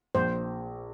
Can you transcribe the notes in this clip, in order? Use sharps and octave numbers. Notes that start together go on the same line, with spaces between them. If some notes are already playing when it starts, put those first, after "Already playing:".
A#1 C5